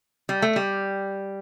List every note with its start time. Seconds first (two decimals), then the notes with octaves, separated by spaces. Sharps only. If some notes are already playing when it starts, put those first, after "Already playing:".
0.29 G3
0.42 A3
0.56 G3